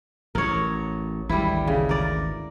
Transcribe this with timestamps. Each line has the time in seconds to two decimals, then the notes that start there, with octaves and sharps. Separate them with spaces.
0.35 A1 A#4 C#5
1.29 G#1 D2 E3 G3 E4
1.67 C#3
1.89 A#4 D5